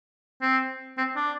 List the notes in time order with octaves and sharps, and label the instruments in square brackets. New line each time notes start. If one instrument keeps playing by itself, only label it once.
[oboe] C4
C4
D4